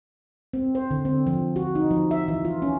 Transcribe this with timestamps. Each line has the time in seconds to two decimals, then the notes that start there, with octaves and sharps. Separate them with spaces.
0.53 C4
0.75 C5
0.91 D3
1.05 C4
1.27 F3
1.56 F#4
1.75 D#4
1.91 F3
2.11 E5
2.28 E3
2.45 F4
2.62 C#4